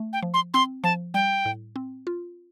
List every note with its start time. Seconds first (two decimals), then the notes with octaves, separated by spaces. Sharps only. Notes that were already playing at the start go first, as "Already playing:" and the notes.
Already playing: A3
0.13 G5
0.23 F3
0.34 C6
0.54 C4 C6
0.84 F3 A5
1.14 G3 G5
1.45 A2
1.76 C4
2.07 F4